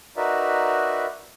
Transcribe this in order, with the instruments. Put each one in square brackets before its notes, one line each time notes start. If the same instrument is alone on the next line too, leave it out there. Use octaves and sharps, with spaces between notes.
[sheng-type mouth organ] D#4 F#4 A#4 B4 D5 E5